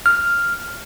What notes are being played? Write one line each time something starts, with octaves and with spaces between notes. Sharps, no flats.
F6